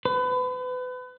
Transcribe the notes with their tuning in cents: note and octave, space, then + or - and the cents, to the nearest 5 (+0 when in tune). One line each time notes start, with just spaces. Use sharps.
B4 +30